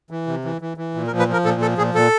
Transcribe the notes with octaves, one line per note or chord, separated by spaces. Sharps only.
E3
C3
E3
E3
E3
A#2
A#4
F3
B4
F3 A#4
A#2 A4
F3 A4
A#2 G#4
A#2 A4